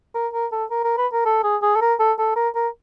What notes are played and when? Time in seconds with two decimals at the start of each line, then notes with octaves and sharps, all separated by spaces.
0.15 A#4
0.34 A#4
0.52 A4
0.71 A#4
0.84 A#4
0.98 B4
1.13 A#4
1.26 A4
1.44 G#4
1.62 G#4
1.76 A4
1.81 A#4
2.00 A4
2.19 A4
2.36 A#4
2.55 A#4